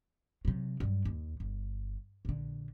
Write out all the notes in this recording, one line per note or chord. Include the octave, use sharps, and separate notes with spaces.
C3 F#3
G2 F#3
D#2
G1
A#1 D3